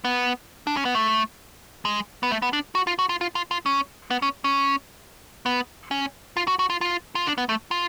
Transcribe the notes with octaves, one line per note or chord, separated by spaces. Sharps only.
B3
D4
C#4
B3
A3
G#3
B3
A3
B3
D4
F#4
F4
F#4
F4
F4
F4
F4
C#4
B3
C#4
C#4
B3
C#4
F4
F#4
F#4
F4
F4
F4
D4
B3
A3
F4